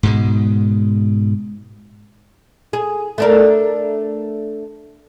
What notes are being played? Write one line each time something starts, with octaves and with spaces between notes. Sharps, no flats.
G#2 B2 G#3
G#4
A3 D4 A#4